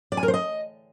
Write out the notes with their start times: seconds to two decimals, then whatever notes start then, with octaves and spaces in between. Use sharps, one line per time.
0.12 D5
0.17 G#5
0.23 A#4
0.28 C5
0.34 D#5